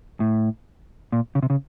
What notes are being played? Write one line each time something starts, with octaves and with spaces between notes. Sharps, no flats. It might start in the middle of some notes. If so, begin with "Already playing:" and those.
A2
A#2
C#3
C3
C#3